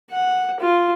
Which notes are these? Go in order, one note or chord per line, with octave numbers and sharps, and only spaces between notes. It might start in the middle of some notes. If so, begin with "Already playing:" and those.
F#5
F4